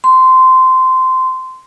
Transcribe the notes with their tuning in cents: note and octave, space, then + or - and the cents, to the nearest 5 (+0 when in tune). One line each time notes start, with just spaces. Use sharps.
C6 -15